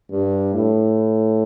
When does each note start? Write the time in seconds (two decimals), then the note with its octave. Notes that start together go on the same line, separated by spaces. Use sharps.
0.10 G2
0.53 A2